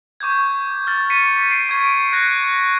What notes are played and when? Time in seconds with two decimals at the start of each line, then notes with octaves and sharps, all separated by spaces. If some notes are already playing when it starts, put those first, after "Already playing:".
0.20 C#6 D6 G6 G#6
0.87 F6 A6
1.10 B6 C#7 D#7
1.49 A6 C7 D7
1.69 C#6 G#6 D7
2.13 F#6 G#6 A#6 C#7